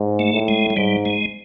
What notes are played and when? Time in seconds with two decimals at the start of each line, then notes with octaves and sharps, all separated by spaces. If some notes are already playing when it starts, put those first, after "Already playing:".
Already playing: G#2
0.19 A3
0.33 A2
0.48 G#3
0.70 G#3
0.77 G#2 G3
1.05 G#3